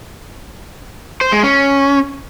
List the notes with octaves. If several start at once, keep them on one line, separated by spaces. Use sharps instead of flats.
C5
G#3
C#4